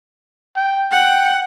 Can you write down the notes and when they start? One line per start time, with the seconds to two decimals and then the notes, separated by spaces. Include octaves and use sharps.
0.56 G5
0.91 F#5 G5